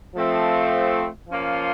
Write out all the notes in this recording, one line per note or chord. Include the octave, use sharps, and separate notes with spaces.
F3 A3 C4
F3 A#3 C#4 F4